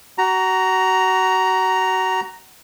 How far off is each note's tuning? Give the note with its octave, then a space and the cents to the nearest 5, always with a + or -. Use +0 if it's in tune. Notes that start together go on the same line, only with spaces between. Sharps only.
F#4 +25 A#5 +0